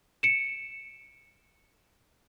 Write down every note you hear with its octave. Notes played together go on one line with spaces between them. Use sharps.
C#7 D7 E7